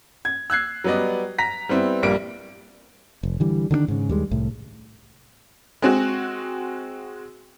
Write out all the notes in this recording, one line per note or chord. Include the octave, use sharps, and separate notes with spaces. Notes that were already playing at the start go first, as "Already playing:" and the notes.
G#6
E6 F#6 G#6 C7
F#3 G3 B3 D5 D#5
A#5 A#6 B6
G3 B3 C4 E4
A#1 G3 A#3 D7
F1
D3 E3 G3
D3 D#3 A#3 D4
G#2 C#3
D#2 G3 G#3
C2 A2
G#3 C4 F#4